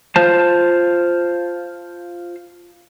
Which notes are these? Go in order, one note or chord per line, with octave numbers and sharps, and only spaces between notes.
F4 C5 A5